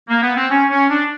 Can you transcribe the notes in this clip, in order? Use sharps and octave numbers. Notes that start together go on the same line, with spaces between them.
A#3
B3
C4
C#4
C#4
D4